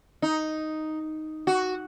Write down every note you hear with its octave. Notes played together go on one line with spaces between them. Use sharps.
D#4
F#4